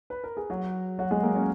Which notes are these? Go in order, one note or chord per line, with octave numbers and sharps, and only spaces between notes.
B4
A#4
G#4
F#3 F#4
F#3 F#4
G#3 G#4
A#3 A#4
C#4 C#5